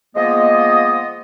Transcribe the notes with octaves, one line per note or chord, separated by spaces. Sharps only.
F3 G#3 A#3 B3 D#5